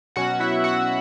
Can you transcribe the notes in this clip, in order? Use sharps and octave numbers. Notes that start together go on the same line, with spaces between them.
B2 F#3 C#4 F#4 F#5
E4 E5
F#4 F#5